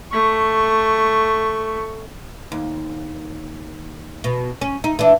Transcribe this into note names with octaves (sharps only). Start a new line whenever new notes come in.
A3 C#6
D#2
B2
C#4
D#4
E3 D4